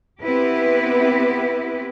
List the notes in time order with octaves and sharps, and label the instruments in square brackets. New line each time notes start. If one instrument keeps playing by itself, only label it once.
[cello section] B3 C4 E4 G4 B4